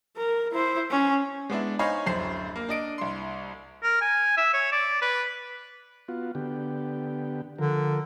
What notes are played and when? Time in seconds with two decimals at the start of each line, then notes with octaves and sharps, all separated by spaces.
0.17 A#4
0.52 E4 C5
0.91 C#4
1.50 G#3 B3 D4 E4
1.79 D#4 C5 C#5 F5 G#5 B5
2.06 D1 F#2 C5 C7
2.56 A#3
2.69 D4 D#5 D7
2.98 C2 C6
3.83 A#4
4.01 G#5
4.37 E5
4.53 C#5
4.72 D5
5.02 B4
6.08 B3 F4 F#4
6.35 D3 B3 G4
7.58 D3 F3 A#4